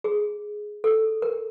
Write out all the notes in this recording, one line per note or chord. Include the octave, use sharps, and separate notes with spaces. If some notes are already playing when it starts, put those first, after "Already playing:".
G#4
A4
A#4